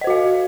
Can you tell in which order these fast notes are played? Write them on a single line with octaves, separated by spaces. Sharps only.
D#5 C5 F#4 F5